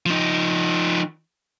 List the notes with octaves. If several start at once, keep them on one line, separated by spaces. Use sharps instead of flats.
F3 D#4